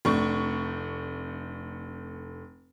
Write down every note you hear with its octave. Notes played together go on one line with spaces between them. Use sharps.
F1 A3 D4 C#6